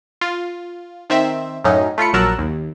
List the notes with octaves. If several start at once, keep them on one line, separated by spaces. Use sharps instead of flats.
F4
D#3 C4 E5
F#2 A2 F#3 C#4 D#4
A3 F4 B5 C#7
A#1 F#3 A#4 A5 E6 F#6
D#2